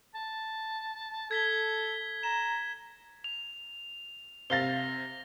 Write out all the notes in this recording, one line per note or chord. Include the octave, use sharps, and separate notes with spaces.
A5
A4 G#6 B6 G7
A#5 E7
F7
C3 F5 A6 A#6 G7